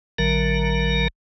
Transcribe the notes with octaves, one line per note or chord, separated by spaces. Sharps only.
A1 D3 F#3 A#4 A#5